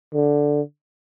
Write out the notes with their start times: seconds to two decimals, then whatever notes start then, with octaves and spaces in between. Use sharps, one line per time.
0.14 D3